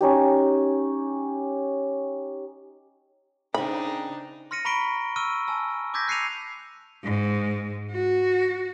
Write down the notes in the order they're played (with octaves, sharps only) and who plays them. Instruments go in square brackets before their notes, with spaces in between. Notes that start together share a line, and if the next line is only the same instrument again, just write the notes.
[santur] C#4 D#4 G4
[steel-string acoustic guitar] C#3 C4 [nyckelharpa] D4 D#4 [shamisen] B5
[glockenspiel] C6 F6 A#6 C#7 D#7
A#5 B5 C#6 B6 D7 G7
C#6 E6 F6 D#7
G#5 A5 E6
D6 E6 G6 G#6 A#6 B6
F#6 C7 C#7 D#7 F7
[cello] G#2
F#4